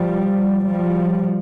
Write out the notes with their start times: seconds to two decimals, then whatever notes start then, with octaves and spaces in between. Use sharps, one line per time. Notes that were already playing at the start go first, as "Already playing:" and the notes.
Already playing: F3 G3
0.66 F3 G3